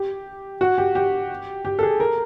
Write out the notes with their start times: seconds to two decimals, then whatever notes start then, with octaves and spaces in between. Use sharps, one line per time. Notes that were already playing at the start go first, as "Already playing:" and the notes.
Already playing: G4
0.61 F#4
0.78 G4
0.95 G4
1.65 G4
1.79 A4
1.83 G#4
2.00 A#4